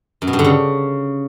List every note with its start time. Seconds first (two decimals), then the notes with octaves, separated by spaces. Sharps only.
0.22 F#2
0.27 B2
0.33 G2
0.39 D3
0.44 C#3